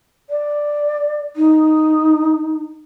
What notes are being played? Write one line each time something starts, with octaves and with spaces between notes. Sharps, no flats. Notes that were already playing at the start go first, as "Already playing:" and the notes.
D5
D#4